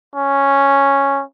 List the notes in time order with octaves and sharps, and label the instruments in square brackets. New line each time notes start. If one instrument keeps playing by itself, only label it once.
[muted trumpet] C#4